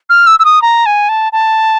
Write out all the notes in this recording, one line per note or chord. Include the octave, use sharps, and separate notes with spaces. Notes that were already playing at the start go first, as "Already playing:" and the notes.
F6
E6
E6
D#6
A#5
G#5
A5
A5